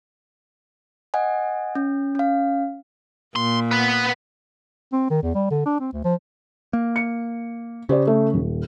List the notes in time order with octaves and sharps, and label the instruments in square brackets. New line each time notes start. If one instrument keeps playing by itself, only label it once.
[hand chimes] D#5 F#5 G#5
C#4
C#4 F5
[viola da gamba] A#2 [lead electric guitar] C6
[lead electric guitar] B3 B4
[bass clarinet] C4
D#3
E2
G3
D3
D4
C4
D2
F3
[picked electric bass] A#3
[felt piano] C#7
[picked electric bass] C#3 [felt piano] G4 C5 D5
[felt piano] A3
D#1